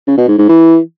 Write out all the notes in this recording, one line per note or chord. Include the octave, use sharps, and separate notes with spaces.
C#3
B2
G#2
G#2
E3